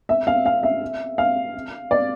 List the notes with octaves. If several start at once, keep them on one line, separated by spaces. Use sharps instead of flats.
E5
F5
F5
E5
F5
D5